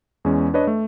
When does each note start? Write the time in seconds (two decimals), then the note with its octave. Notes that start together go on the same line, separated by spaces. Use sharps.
0.25 E2 G#3 C#4
0.54 D4 B4 C#5 D#5
0.67 A3